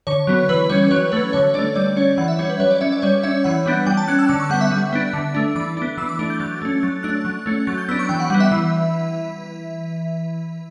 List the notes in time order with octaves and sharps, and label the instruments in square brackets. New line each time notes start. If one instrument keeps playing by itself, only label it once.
[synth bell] D3 C#5
F#3 B3
E3 B4
G3 C#4 C#5
F#3 C#5
A3 C#4 B4
D3 C#5
A3 D4 D5
G3 D5
C#4 C#5
E3 F#5
E5
G3 C#4 C#5
B4
F#3 C#5
D5
C#4 E5
D5
G3 C#5
C#4 E5
E3 F#5
G3 B3 D4
G3 G5
A5
C#4 F#6
E6
D3 D6
C#6
G3 B3 F#5
E5
G3
B3 D4
D3
A3 D4
E3 D6
B3 D4
E3 E6
D6
A3 D4
G6
F#3 A6
A3 C#4
F#3 A6
A3 D4 F#6
F#3
A3 C#4
F#3 A6
G6
B3 D4 E6
C#6
E3 G5
F#5
G3 B3 F#5
E5
E3